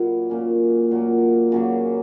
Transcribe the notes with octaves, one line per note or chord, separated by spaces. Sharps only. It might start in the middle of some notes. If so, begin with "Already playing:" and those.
Already playing: A#2 F#3 A#3 E4
A#2 A#3 C#4
A#2 F#3 A#3
C#3 F#3 A#3